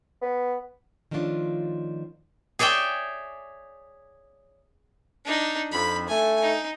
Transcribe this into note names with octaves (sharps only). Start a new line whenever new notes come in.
B3
D#3 F3 A3 C#4 D4 F4
G#4 C#5 D5 E5 G5
D4 D#4
F2 B5
A3 G#5
D#4